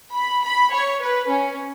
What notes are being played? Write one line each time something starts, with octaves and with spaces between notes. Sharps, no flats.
B5
B5
C#5
B4
C#4